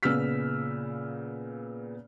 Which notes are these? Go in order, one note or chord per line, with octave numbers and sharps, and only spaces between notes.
A#2 C#3 B3 E6 F6 B6